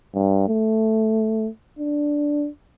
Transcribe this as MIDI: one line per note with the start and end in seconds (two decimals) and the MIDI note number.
0.14 0.43 43
0.48 1.49 57
1.79 2.48 62